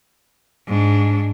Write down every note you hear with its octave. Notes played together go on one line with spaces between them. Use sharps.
G#2 D4